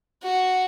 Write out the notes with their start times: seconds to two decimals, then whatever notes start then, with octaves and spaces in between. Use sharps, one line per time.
0.23 F#4